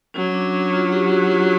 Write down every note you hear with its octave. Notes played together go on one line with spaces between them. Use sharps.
F#3 C#4
D4
F4
G4
F#4
F4